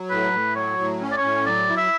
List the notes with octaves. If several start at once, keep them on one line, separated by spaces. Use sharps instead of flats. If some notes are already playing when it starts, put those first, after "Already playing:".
Already playing: F#3
A2 B4
A2
F#3 C#5
A2
C#4
D5
C#5
A2
F#3 D5
E4
E5